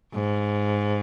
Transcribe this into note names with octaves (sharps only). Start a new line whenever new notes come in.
G#2